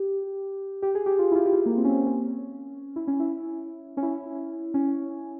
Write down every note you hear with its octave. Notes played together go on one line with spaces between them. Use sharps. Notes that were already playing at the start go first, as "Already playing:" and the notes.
Already playing: G4
G4
G#4
G4
F4
E4
F4
G4
F4
A#3
C4
C#4
C4
C4
C#4
E4
C#4
E4
C#4
E4
C#4